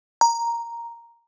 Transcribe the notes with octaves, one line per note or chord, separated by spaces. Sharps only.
A#5